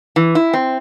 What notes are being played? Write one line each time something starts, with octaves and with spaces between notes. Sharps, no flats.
E3
E4
C4